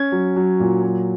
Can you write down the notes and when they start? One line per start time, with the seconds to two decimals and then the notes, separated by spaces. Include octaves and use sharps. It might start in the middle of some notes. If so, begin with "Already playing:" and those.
Already playing: C#4 G#6
0.12 F#3
0.36 F#3
0.60 A#2
0.83 F#3